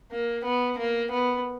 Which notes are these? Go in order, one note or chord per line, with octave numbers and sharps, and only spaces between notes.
A#3
B3
A#3
B3